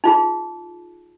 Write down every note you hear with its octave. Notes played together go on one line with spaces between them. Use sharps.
D#4 F4 G#4